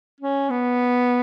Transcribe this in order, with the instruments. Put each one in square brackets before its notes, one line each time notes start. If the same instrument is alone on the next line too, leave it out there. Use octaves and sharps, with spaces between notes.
[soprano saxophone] C#4
B3